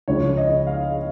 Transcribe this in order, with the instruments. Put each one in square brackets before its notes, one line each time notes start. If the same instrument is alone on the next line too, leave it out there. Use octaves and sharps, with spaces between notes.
[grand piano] C#2 C#3 F3 C#5
D#5
F5